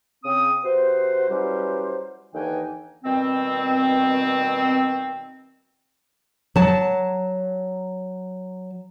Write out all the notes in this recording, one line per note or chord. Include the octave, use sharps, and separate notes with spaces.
C#3 C4 D#6
C3 F#4 B4 C5
E3 F#3 G3 C#4 G4 C5
D#2 D3 E3 D#4 G5 G#5
B2 D#3 G3 C4
F#3 A5